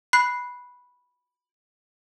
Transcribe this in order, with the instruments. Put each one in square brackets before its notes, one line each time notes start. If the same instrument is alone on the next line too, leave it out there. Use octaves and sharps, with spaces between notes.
[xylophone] B5 F#6 C7